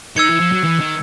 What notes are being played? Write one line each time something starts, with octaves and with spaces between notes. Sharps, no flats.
D#3 E6 G#6 C#7
E3
F3
F#3
E3
D#3